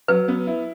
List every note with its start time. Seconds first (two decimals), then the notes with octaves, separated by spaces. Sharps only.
0.08 F#3 B4
0.28 B3
0.47 E4